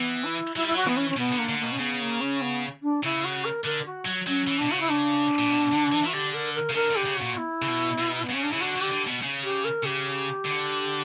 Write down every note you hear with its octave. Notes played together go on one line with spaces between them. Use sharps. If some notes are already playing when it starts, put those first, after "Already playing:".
Already playing: E3 B3
E4
F#3 E4
G3
E4
F#3 F#4
E3 B3
C#4
C#4
B2 B3
D3
A#3
D3
B2 A#3
C#4
C#3 B3
A#3
C#4
B3
D4
C#3 E4
F#4
A#4
D3 A#4
F#4
F#3
F#3 C#4
E3
B2 D4
C#3 F#4
E4
D4
A#2
B2
D3
E3
E3 F#4
D3 G4
A#4
A#4
C#3
D3 A#4
D3
G4
C#3
F#4
A#2
E4
C#3
B2
B2
B3
C#3 C#4
D4
C#3 E4
D3 F#4
D3 G4
D3
B2
C#3
G4
A#4
C#3 G4
D3